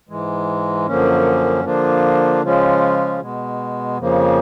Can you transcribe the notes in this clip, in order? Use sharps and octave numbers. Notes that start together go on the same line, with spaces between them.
G#2 E3 G#3
F#2 D3 F3 A#3 C#4
D3 F3 A#3 D4 F4
C#3 F3 G#3 C#4 F4
B2 G#3 B3
F2 C#3 F3 A#3